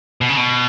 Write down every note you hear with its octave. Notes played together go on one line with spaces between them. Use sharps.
B2
C#3
B2